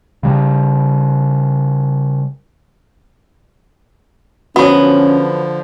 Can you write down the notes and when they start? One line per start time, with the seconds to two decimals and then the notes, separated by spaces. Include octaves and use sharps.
0.23 C#3 G3
4.56 D3 F3 F#3 B3 C#4 F#4